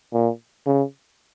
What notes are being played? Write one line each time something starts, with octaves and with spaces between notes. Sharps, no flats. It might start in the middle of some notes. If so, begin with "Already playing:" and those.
A#2
C#3